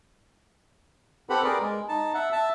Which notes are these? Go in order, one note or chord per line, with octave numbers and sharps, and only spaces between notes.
C4 G4 A4 B4 F#5 B5
G#4 A#4 B4 D5
G#3
D#4 A5
E5 F#5
E5 A5